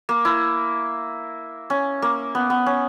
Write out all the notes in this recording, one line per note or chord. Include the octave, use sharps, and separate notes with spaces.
A#3
E4
C#4
A#3
B3
B3
C#4